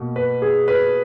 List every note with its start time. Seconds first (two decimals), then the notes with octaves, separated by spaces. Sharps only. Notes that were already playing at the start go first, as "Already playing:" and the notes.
Already playing: B2 A#3
0.16 B4
0.42 G#4
0.68 B4